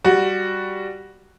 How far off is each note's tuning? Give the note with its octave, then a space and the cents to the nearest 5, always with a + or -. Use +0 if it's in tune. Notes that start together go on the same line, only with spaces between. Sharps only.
G3 +0 F#4 +0